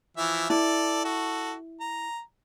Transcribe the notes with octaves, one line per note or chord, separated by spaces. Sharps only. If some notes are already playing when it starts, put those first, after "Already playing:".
E3 F3 E5
E4 A4 D5
F#4 A4
A#5